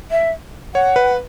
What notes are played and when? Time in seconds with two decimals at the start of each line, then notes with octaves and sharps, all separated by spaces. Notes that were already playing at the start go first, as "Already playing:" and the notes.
0.11 E5
0.74 C#5 F#5
0.96 B4